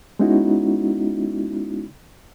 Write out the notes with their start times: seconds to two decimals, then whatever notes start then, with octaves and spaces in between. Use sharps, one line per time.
0.19 G#3 B3 C#4 D#4 E4 F#4